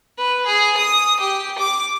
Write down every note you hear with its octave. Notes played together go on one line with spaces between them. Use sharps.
B4
G#4
D#6
G4
D6